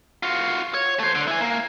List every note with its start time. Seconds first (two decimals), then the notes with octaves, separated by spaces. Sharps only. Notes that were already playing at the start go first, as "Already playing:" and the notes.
0.23 F4 F#4
0.74 C#5
0.99 A3 C5
1.15 D3
1.28 E4 G#5
1.41 A#3